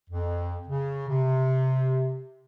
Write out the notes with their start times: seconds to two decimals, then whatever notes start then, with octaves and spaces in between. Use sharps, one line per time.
0.10 F2
0.68 C#3
1.09 C3